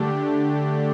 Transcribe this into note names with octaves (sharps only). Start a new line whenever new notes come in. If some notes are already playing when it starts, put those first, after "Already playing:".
Already playing: D3 A3 D4 G4